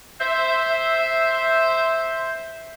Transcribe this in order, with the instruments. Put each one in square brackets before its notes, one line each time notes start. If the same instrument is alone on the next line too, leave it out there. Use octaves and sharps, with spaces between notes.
[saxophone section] C5 E5